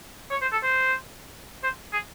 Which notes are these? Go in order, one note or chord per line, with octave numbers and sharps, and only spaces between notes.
C#5
C5
A4
C5
C5
G#4